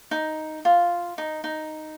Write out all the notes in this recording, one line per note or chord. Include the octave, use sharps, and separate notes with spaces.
D#4
F4
D#4
D#4